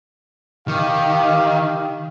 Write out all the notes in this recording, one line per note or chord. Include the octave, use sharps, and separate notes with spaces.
D#3 G4 F5